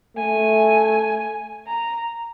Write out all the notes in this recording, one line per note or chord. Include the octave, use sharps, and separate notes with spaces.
A3 G#5
A#5